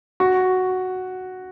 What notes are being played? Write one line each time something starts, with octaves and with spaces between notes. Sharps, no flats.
F#4